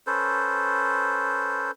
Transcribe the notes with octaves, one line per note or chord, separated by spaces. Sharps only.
C#4 A4 B4 C5